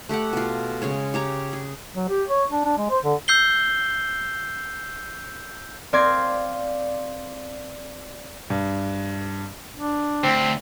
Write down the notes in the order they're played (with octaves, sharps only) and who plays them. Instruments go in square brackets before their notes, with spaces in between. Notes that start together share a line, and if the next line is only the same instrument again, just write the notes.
[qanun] A3 G4 A4 F#5
B2 F4
C#3 G#3 C#5
G4 C#5 A#5
G#4
[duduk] F#3
G4
C#5
D4
D4
G#3
C5
D3
[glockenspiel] E6 G6 C7 G7
[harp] C4 D5 F5 C6 G#6 A#6
[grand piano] G2
[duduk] D4
[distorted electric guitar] D2 [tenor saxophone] C4